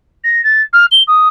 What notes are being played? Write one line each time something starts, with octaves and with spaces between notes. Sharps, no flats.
A#6
A6
F6
G7
D#6